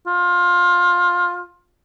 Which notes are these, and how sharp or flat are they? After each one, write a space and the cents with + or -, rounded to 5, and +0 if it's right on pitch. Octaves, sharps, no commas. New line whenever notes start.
F4 +20